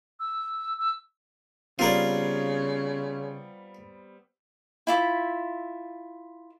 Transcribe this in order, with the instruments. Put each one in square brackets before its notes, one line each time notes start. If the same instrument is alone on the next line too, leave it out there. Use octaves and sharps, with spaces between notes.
[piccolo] E6
E6
[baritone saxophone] C#3 [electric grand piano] G3 B3 C4 [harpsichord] F4 A#4 D5
[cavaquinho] E4 F4 E5